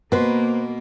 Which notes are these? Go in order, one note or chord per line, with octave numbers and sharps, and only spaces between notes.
B2 A#3 B4 C5